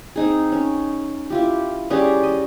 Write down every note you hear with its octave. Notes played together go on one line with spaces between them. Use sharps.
C4 D#4 G#4
C#4
E4 F4 G4
G3 C#4 G4 G#4
D#5